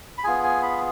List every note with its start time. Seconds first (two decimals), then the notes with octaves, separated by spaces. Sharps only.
0.18 B5
0.24 B3 F4 G#4 G#5
0.44 G#5
0.63 B5